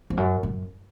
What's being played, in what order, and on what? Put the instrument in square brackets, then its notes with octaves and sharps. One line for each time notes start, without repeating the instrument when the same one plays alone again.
[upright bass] F2
F#2
F#2